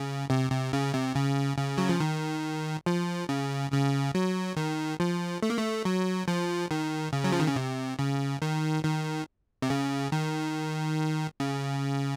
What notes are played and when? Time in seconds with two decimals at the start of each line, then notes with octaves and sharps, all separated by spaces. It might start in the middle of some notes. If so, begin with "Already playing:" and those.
Already playing: C#3
0.30 C3
0.52 C3
0.73 C#3
0.94 C3
1.15 C#3
1.58 C#3
1.78 F#3
1.89 F3
2.00 D#3
2.86 F3
3.29 C#3
3.72 C#3
4.15 F#3
4.57 D#3
5.00 F3
5.42 A3
5.50 A#3
5.58 A3
5.85 F#3
6.28 F3
6.71 D#3
7.13 C#3
7.24 F#3
7.32 F3
7.40 D#3
7.48 C#3
7.56 C3
7.99 C#3
8.42 D#3
8.84 D#3
9.62 C3
9.70 C#3
10.12 D#3
11.40 C#3